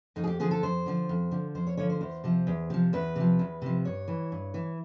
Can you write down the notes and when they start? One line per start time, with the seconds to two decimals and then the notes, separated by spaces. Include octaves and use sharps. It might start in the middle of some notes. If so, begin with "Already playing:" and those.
0.16 F2 D#4
0.24 G#4
0.27 G4
0.40 D3 F3 G#4
0.51 A4
0.63 F2 C5
0.86 D3 F3
1.09 F2
1.31 D3 F3
1.55 F2 C5
1.67 C#5
1.77 D3 F3 C#5
1.90 C5
2.01 E2 C5
2.24 C3 F3
2.47 E2
2.70 C3 F3
2.93 E2 B4
3.16 C3 F3
3.39 E2
3.62 C3 F3
3.85 G2 C#5
4.08 E3
4.32 G2
4.54 E3